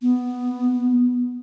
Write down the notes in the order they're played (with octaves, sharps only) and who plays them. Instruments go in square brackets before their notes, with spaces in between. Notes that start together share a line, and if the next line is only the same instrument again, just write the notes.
[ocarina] B3